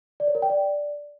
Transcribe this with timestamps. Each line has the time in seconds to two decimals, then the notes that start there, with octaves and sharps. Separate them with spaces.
0.20 D5
0.27 C#5
0.35 A#4
0.42 G5
0.50 D5